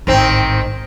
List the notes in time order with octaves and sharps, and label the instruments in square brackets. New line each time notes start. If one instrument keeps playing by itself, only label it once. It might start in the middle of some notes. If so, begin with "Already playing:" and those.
[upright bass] A1 G#2 [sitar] D#3 C4